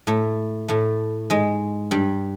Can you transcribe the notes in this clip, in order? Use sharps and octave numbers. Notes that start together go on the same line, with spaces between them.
A2 A3
A2 A3
G#2 G#3
G2 G3